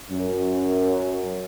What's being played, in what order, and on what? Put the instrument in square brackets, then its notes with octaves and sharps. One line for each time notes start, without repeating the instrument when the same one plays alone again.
[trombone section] F#2